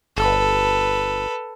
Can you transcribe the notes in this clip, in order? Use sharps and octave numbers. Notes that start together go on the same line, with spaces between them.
G1 A4 B4